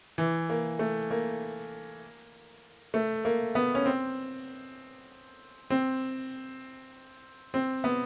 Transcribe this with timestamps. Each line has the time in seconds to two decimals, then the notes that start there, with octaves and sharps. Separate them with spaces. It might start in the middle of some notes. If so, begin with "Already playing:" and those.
0.18 E3
0.49 A#3
0.79 A3
1.11 A#3
2.94 A3
3.25 A#3
3.55 B3
3.75 C#4
3.86 C4
5.70 C4
7.54 C4
7.84 B3